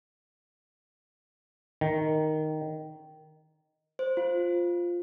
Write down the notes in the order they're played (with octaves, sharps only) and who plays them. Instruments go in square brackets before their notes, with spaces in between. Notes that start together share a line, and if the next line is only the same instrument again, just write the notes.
[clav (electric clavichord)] D#3
[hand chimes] C5
F4